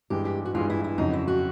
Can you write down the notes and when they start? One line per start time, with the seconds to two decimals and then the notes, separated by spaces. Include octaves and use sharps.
0.10 G2 E3 G#3 G4
0.25 G4
0.45 F#4
0.54 G2 E3 G#3 F4
0.70 E4
0.84 E4
0.98 F2 C#3 F#3 D#4
1.13 E4
1.28 F#4